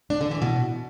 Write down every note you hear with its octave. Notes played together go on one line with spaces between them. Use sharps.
D4
D3
E3
B2